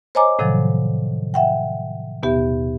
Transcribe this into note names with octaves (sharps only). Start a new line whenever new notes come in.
C5 C#5 D#5 G#5 A#5 D6
A2 C3 D#3 F3 F#3
E5 F#5 G5
D#2 B2 B3 G4 E5